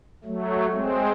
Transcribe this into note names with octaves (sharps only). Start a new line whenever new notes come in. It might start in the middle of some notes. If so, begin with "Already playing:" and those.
F#3 A3
G#3 C4